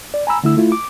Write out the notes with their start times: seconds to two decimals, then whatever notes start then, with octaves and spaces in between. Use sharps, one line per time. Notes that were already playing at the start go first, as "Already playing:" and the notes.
0.14 D5
0.27 G#5 A#5 B5 E6
0.43 D2 D3 A3 E4 E6
0.57 A3 E4 F4
0.72 D6